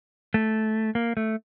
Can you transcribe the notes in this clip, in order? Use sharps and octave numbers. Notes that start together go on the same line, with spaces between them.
A3
A#3
A3